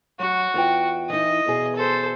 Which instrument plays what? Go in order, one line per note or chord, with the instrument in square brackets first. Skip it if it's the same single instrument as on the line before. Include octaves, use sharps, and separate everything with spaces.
[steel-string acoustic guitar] F#3 [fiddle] F#4
[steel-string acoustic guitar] E2 F4 G5
[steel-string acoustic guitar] E3 D#4 [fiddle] D#5
[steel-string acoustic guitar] E2 B2 G#4
[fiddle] A4 C5